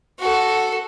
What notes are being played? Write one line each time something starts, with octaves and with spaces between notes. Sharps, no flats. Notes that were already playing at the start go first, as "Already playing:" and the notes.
F#4 A4